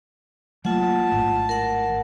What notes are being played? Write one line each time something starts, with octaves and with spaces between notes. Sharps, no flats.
F#3 A3 A#3 F4 F#5 A5
G#1 A2
A#4 F#5